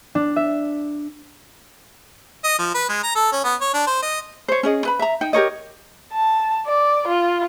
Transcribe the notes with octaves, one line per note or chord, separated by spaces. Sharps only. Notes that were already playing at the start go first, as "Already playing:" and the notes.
D4
E5
D#5
F3
B4
G#3
A#5
A4
C#4
B3
C#5
D4
C5
D#5
C5 C#5
C#4 G#4 D#5
B4 B5
E5 A#5
D#4 G5
G4 A#4 C#5 D#5
A5
D5
F4